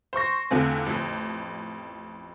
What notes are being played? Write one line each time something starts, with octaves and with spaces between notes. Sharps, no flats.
C5 C6 C#6 A#6
E2 D3 A3 C4 F4 G#5
A1 F2